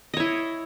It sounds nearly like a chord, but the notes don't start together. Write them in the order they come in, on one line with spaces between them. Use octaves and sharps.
D#5 C#5 E4